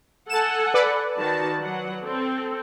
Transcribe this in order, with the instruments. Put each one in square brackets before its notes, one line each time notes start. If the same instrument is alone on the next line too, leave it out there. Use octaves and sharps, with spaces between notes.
[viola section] A4 F#5 G#5 [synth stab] A5 E7
[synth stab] B4 D5
[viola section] D#3 F#4 A5
F#3 F#5
C4 A4